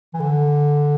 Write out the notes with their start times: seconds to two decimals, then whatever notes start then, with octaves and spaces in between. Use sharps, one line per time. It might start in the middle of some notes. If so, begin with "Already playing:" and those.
0.14 E3
0.20 D3